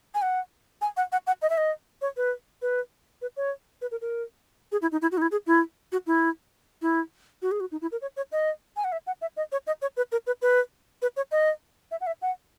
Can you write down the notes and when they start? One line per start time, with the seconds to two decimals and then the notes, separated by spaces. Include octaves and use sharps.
0.14 G#5
0.22 F#5
0.81 G#5
0.97 F#5
1.12 F#5
1.27 F#5
1.42 D#5
1.49 E5
1.57 D#5
2.01 C#5
2.17 B4
2.62 B4
3.22 B4
3.36 C#5
3.81 B4
3.91 A#4
4.01 A#4
4.72 G#4
4.82 E4
4.92 D#4
5.02 E4
5.11 F#4
5.17 D#4
5.22 E4
5.31 G#4
5.46 E4
5.92 F#4
6.06 E4
6.82 E4
7.42 F#4
7.51 G#4
7.60 F#4
7.72 D#4
7.82 E4
7.92 A#4
8.01 C#5
8.16 C#5
8.32 D#5
8.76 G#5
8.84 F#5
8.92 E5
9.07 F#5
9.21 E5
9.37 D#5
9.52 C#5
9.67 D#5
9.82 C#5
9.97 B4
10.12 A#4
10.26 B4
10.42 B4
11.02 B4
11.16 C#5
11.31 D#5
11.91 E5
12.01 F#5
12.07 E5
12.22 F#5